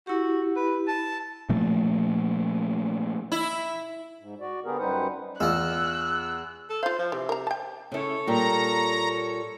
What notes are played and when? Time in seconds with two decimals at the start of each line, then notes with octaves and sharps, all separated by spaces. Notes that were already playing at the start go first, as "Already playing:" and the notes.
0.07 E4 F#4 G4
0.56 B4
0.88 A5
1.49 A#2 F3 A3 A#3
3.32 E4
4.19 G#2
4.40 F#4 D5
4.65 D3 B3 G4 G#4 A#4
4.79 F#2 G3 D#4 B4 C5 F#5
5.40 E2 F4 D#5 E6 F#6
6.69 A4
6.83 F4 C5 F5
6.98 F3
7.12 C3 E3
7.29 A#4 A#5
7.47 G5 A5
7.92 C#3 E4 A4 C#5
8.27 A#2 G3 A#5